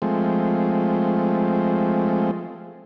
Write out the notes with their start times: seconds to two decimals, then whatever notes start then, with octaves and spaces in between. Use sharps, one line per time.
0.02 F3 G#3 A3 C4